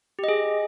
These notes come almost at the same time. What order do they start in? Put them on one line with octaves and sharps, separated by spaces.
G4 D#5 G#4